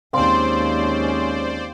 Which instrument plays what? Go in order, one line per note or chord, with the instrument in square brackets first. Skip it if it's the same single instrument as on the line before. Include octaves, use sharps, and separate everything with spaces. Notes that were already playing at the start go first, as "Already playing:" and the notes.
[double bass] D#2 [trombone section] G#3 C#4 [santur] C4 F5 C6 [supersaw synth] C5 D5